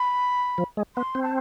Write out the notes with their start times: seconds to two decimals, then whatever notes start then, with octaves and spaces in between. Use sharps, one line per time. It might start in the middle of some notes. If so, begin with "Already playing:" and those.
Already playing: B5
0.58 F3
0.77 G#3
0.96 B3 C6
1.15 C4
1.23 A5